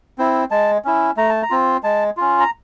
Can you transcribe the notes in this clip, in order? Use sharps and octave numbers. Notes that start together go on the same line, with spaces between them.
C4 E4
G#3 A5
C#4 E4
A3 A#5
A5
A#5
C4 F4
G#3 A5
C#4 F4
A#5